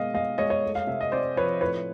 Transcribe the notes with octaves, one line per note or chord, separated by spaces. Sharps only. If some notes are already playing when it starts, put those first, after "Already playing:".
Already playing: B2 G#3 A#3 D#5 F5
G#3 D#5 F5
G#3 C#5 D#5
C#5 D#5
A3
F5
C3 E5
D#5
C4 C5 D5
F3 B4 C#5
A2 B4 C#5